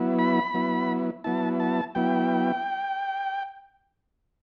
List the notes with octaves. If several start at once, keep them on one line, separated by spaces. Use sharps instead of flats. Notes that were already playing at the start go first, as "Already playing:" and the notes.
Already playing: F#3 B3 E4
B5
F#3 B3 E4
F#3 B3 E4 A5
A5
F#3 B3 E4 G5